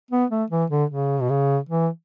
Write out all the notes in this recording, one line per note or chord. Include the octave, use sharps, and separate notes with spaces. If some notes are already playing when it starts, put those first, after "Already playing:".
B3
A3
E3
D3
C#3
B2
C#3
E3